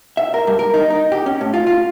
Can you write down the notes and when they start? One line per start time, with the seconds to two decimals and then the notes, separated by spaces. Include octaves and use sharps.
0.17 E5
0.34 A#4
0.47 G2
0.59 A#4
0.74 D#4
0.90 D#4
1.12 G4
1.26 C#4
1.41 A2
1.54 F4
1.67 F4